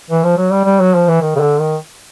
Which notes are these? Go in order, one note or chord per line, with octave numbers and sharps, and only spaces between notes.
E3
F3
F#3
G3
G3
F#3
F3
E3
D#3
C#3
D3
D#3